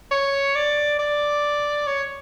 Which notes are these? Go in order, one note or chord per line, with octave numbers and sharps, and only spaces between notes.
C#5
D5
D5
C#5